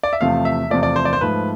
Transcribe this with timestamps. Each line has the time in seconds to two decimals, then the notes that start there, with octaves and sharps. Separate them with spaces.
0.03 D5
0.13 E5
0.21 E2 C3 F3 A3 F5
0.45 E5
0.70 E2 C3 F3 A3 D5
0.83 D5
0.96 C5
1.05 D5
1.13 C5
1.21 G#2 F3 A3 B4